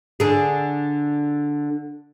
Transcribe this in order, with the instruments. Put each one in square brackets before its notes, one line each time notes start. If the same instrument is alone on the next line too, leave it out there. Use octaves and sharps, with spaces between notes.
[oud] D3 G#4